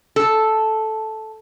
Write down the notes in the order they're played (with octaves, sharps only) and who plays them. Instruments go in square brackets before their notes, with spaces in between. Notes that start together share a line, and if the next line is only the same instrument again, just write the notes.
[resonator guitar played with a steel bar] A4